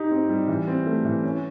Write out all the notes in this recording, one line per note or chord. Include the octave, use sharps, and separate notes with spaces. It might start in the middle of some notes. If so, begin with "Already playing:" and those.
Already playing: D#4 G4
C4
G3
E3
C4
A3
E3
C#4